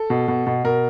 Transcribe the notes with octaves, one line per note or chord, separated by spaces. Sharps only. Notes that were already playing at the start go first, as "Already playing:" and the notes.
Already playing: A4
B2
B2
B2
B2 A#4